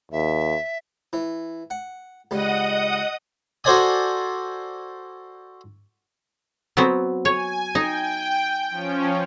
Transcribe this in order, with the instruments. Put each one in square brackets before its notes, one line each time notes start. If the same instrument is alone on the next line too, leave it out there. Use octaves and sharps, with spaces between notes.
[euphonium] D#2 [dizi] E5
[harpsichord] E3
F#5
[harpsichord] C#2 G3 [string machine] D#5 F#5 D#6
[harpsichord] F#4 A4 C5 D5 G#5 D#6
[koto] F#3 B3 C4
[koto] C#5 [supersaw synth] G#5
[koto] D#4 [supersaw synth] G5
[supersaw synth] F3 C#4